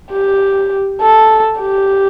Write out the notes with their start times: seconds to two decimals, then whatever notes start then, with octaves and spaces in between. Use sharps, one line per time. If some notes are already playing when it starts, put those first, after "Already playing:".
0.12 G4
1.01 A4
1.60 G4